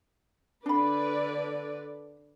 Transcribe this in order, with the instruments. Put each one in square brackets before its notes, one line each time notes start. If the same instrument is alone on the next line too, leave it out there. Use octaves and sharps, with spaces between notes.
[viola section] D3 B4 D5 [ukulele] D4 B5